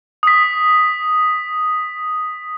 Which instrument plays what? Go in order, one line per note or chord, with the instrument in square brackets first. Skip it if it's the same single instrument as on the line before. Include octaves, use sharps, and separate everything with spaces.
[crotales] D#6 B6